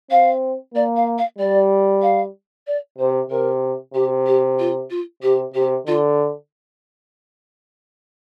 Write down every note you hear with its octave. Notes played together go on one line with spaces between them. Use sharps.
C4 F5
A#3 D5
F5
F5
G3 D5
F5
D5
C3 C5
C3 A#4
C3 G4
G4
F4
F4
C3 G4
C3 G4
D3 F4